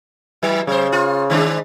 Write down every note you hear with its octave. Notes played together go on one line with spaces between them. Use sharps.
E3 F#3
C#3 F#3 C5
F4
D#3 G#3 D4